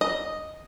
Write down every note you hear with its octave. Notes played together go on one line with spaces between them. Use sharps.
D#5